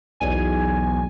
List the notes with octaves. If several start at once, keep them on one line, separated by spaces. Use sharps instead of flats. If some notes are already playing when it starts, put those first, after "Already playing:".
B1 E2 G#5